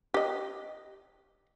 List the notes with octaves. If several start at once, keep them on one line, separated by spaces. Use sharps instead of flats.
G4 D#5